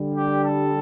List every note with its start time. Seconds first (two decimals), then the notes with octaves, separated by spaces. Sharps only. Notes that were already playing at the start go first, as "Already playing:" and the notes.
Already playing: D3 G3
0.14 G4
0.45 A4